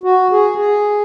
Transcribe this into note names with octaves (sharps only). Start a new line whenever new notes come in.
F#4
G#4
G#4